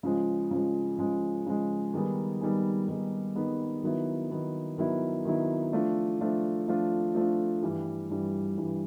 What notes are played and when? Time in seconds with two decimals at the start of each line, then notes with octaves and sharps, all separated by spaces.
0.03 C#3 F3 G#3
0.51 C#3 F3 G#3
0.98 C#3 F3 G#3
1.46 C#3 F3 G#3
1.94 D#3 G3 B3 D#4 G#4
2.41 D#3 G3 B3 D#4 G#4
2.88 D#3 G3 B3 D#4 G#4
3.35 D#3 G3 B3 D#4 G#4
3.83 D#3 F#3 B3 E4
4.31 D#3 F#3 B3 E4
4.78 D#3 F#3 B3 E4
5.25 D#3 F#3 B3 E4
5.72 F3 A3 D4 F4
6.20 F3 A3 D4 F4
6.67 F3 A3 D4 F4
7.15 F3 A3 D4 F4
7.62 G2 E3 G3
8.10 G2 E3 G3
8.57 G2 E3 G3